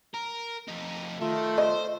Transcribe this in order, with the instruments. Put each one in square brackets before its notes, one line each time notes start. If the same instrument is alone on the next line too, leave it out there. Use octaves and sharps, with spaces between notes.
[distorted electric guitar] A#4
F2 D#4
[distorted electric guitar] D#3 [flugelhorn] A3 [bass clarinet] F4
[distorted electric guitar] C5 [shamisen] D#5